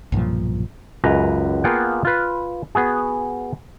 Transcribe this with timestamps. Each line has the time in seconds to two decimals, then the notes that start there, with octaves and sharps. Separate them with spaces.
0.12 B1 G2 A#2 F3
1.04 C#2 F#2 B4 A#5
1.64 A#3 B3 F4 G#4 F#5 G5
2.05 F4 B4
2.75 B3 F#4 G#4